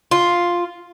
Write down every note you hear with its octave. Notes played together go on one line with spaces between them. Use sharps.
F4